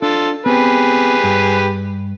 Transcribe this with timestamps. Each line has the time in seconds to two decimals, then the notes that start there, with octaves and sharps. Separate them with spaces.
0.02 D4 F4 A4
0.46 B3 C4 G4 G#4 B4
1.24 G2